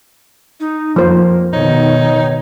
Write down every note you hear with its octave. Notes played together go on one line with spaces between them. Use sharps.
D#4
F2 F3 A#3 C5
B2 D#3 D#4 C#5